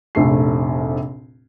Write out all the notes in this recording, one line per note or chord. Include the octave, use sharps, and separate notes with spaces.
F1 A#1 A3 C7